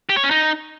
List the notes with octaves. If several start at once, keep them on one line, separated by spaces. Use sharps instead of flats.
G4
C#5
C#4
D#4